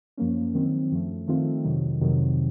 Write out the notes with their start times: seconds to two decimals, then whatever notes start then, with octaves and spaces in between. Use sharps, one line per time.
0.17 F#2 F3 A#3 C#4
0.54 D#3 F#3 C4
0.91 F#2 F3 A3
1.27 D#3 A3 C4 F4
1.64 F2 C3 D#3 F#3
2.01 F2 C3 D#3 F#3